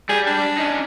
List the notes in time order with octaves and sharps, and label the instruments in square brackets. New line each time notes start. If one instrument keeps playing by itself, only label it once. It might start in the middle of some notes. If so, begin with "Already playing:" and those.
[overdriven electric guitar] G3 G4 [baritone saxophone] G#4
[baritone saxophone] D4
[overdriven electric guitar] C#4 D#4